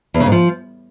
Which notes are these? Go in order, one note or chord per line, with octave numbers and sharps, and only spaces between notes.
E2
C#3
G#2
F3